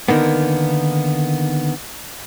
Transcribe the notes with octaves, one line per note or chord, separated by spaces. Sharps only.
D3 D#3 A#3 B3